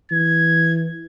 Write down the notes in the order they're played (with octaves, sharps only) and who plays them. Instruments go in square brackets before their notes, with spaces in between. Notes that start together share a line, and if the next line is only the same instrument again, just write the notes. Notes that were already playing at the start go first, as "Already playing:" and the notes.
[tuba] E3 [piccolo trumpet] G#6